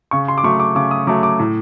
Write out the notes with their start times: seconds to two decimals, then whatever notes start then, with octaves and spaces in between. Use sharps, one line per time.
0.11 C#3 C#6
0.28 C6
0.38 D6
0.43 F#3 A3 C#6
0.60 D6
0.75 C#3 D6
0.91 D#6
1.07 F#3 A3 D6
1.23 D6
1.39 A2